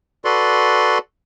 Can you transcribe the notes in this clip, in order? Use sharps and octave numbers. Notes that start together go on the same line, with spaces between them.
F#4 A4 B4 D5 C6